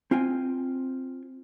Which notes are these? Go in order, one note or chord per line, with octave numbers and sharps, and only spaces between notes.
C4 F4 G5 G#5